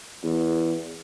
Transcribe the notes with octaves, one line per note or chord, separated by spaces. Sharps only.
E2